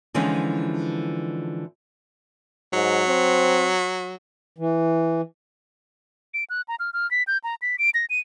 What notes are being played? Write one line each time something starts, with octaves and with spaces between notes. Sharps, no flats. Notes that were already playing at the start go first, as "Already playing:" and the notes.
D3 E3 F3 G#3 C#4 D#4
G#2 F#3
C4
E3
D7
F#6
A#5
F6
F6
B6
G6
A#5
B6
D7
A#6
D#7